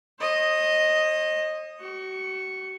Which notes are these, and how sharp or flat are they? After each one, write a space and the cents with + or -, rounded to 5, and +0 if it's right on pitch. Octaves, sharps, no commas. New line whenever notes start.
C5 +45 D#5 +0
F#4 +40 C#6 -5